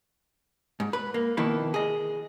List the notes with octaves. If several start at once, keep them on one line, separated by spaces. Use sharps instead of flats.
G#2
B4
A#3
F2 B2 D#3 A#3 E4 B4
G#4 D#5